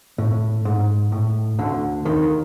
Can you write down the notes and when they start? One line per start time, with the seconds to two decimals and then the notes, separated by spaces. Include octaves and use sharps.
0.18 A2
0.65 G#2
1.12 A2
1.59 D2 D3
2.05 D#2 D#3